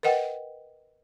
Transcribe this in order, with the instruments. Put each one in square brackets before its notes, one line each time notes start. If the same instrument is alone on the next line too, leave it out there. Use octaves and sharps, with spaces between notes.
[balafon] A#4 B4 D#5 F#5 G5